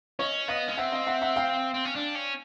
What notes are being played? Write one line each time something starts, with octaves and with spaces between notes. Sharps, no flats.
C#4 C#5 D#5
B3 D#5 F5
C#4
C4 E5 F#5
D#5 F5
E5 F#5
E5 F#5
F5 G5
C4
C#4
D4
C#4